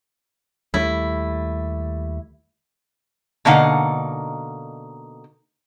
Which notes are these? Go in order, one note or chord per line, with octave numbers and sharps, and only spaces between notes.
D#2 G3 A3 E4
B2 D3 A#3 D#4 F5 F#5